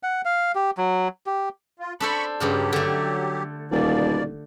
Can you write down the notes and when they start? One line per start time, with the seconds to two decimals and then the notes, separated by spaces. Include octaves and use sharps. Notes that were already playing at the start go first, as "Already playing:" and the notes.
0.03 F#5
0.25 F5
0.55 G4
0.77 F#3
1.26 G4
1.80 F4
2.00 D4 A4 C5 B5 C#6
2.40 G2 C#3 F#3 F4 G4
2.73 D3 A3
3.71 D#1 B2 A#3 D5